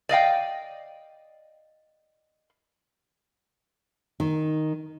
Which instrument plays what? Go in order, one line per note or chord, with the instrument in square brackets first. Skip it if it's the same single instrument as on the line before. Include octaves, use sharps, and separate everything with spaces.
[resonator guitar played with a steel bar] D5 D#5 F5 G5
[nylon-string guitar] D#3